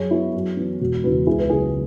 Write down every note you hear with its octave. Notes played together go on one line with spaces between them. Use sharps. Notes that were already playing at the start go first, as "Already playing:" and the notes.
Already playing: F#2 G#4 C#5
F#3 B3 E4
F#2 F#4
E3 B3
E1 F#4
E2 C#3 E3 F#4 B4
C#2 E4 G#4
B4
C#3 F#3 E4 G#4